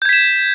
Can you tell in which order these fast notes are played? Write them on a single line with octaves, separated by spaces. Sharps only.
G6 G#6 B6 E7